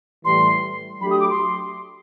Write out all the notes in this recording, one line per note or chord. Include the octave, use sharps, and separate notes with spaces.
A2 E3 G3 C6
F#3 A3 D4 G4 B5
D#6
D6
C6